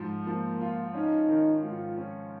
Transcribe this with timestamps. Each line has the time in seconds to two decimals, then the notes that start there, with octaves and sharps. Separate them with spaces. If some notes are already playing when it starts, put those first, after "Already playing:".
Already playing: G#2 F3
0.26 F3 A#3
0.61 F4
0.94 C#4 D#4
1.29 D#3
1.63 G#2 F4
1.97 C#4